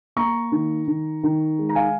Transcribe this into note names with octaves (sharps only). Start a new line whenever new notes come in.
A#3 A#5 C#6
D#3
D#3
D#3
G#3
A#5
F5 G#5